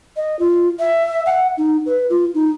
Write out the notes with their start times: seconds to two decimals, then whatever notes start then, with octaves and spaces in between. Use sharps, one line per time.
0.16 D#5
0.39 F4
0.79 E5
1.26 F#5
1.57 D#4
1.86 B4
2.10 F4
2.34 D#4